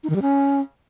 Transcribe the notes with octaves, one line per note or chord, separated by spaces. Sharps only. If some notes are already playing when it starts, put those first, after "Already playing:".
D#4
D#3
G3
C#4